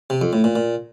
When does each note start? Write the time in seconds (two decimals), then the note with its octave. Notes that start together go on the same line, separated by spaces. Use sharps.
0.10 C3
0.21 F2
0.33 A2
0.44 A#2
0.56 A#2